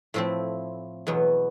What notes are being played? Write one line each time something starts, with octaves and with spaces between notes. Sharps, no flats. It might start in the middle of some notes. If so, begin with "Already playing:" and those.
A2 F3 A3 C4 E4
E2 B2 F#3 B3